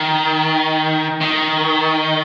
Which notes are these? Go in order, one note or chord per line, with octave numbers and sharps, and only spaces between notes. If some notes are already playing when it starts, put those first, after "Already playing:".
Already playing: D#3
D#3